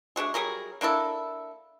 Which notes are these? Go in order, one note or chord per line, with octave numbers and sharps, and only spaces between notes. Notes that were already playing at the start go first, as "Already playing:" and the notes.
A3 D4 F#4 G#4
F#3 G3 G#4 A#4
A#3 D4 E4 A4